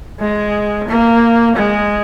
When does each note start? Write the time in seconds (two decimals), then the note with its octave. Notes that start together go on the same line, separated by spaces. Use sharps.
0.20 G#3
0.88 A#3
1.56 G#3